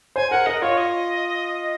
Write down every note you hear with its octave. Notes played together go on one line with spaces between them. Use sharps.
C5 G#5
A#4 F#5
A#4 D#5
F4 C#5
D#5